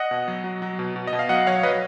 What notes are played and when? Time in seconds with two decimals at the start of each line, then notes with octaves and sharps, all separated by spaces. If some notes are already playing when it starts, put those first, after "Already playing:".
Already playing: D#5 F#5
0.11 B2
0.28 F#3
0.44 F#3
0.62 F#3
0.79 B2
0.96 B2
1.07 D#5
1.13 B2
1.19 F5
1.29 F#3 D#5 F#5
1.47 F#3 C#5 F5
1.63 F#3 B4 D#5